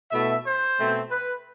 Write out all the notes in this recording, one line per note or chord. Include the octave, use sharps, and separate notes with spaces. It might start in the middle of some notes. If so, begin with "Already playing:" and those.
B2 A3 E4 E5
C5
B2 A3 C4
B4